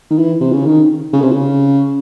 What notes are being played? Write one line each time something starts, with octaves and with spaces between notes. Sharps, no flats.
D#3
E3
C3
C#3
D#3
C#3
C3
C#3